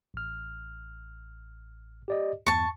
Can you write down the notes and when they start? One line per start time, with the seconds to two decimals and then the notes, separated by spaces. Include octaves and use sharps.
0.14 A1 F6
2.08 G4 D5 D#5
2.46 E2 G2 A5 C#6